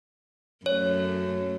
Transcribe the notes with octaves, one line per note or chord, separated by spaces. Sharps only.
F#2 A3 C#5